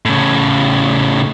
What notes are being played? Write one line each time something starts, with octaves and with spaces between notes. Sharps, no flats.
A2 C#3